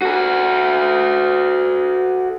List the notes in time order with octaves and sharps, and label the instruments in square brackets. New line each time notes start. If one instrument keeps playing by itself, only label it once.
[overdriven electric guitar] F#4 A4